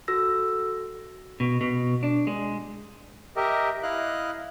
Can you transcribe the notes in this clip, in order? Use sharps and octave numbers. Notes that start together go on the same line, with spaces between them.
F#4 A4 E6 A#6
B2
B2
D4
G#3
G4 A#4 D#5 E5
E4 D#5 F5 F#6